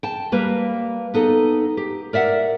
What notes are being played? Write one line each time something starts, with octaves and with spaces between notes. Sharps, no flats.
G5 A5
G3 A#3 B4
B3 D#4 A4
G4
A#4 D5 E5 F#5